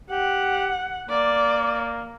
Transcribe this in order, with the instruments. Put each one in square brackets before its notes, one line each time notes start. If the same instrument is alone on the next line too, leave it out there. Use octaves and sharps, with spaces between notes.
[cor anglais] G4 [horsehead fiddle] F#5
[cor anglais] A#3 [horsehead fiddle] D5